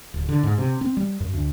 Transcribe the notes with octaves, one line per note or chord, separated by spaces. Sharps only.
D1
D3
G#2
C3
C4
G3
F#2
D2